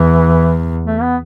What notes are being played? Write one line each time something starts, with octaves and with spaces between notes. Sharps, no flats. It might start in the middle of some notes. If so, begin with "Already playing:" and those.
Already playing: E2 E3
A3
B3